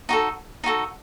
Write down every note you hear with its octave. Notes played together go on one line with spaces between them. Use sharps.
D#4 F#4 A4
D#4 F#4 A4